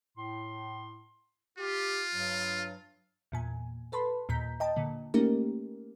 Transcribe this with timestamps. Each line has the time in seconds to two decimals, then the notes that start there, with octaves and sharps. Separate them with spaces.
0.18 A2 C6
1.58 F4 G4
2.14 G2 F#3
3.32 E2 A#2 G#5
3.92 A4 B4 A5 B5 C6
4.29 D#2 A#2 A#5 G6 B6
4.60 D#5 G5 A5
4.76 A#2 D3
5.14 A3 A#3 C#4 D#4 G4 A#4